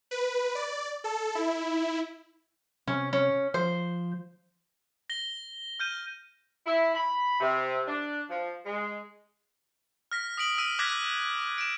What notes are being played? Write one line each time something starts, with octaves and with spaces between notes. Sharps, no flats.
B4
D5
A4
E4
C3 C#4
C#4
F3 C5
A#6 G7
F6 G6 D#7
E4
B5
C3
D4
F3
G#3
F6 A#6 B6
D#6 B6 D7 F#7
E6 B6 D#7
D6 F6 F#6 G#6 A#6 B6
D7 E7